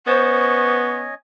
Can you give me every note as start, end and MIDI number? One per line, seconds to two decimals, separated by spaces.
0.07 1.10 59
0.07 1.14 61
0.07 0.79 72
0.07 1.14 73
0.07 1.14 75
0.07 0.97 85